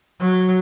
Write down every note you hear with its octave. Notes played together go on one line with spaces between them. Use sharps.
F#3